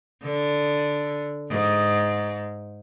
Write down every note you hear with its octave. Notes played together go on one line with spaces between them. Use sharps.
D3
G#2